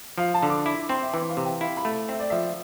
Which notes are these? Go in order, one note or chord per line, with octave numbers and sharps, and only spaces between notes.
F3 F5
A5
D3
D6
E4 D6
C4 C6
E5
E3 G5
F5
C3
G5
E4 F5
B5
A3
C4 E5
D5
F3 E5